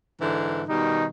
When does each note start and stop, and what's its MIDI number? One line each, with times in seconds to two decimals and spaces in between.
0.21 0.63 44
0.21 0.63 50
0.21 0.63 52
0.69 1.06 47
0.69 1.06 51
0.69 1.06 55
0.69 1.05 63